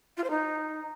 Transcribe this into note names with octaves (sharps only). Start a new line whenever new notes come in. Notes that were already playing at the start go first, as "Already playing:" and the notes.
F4
C5
D#4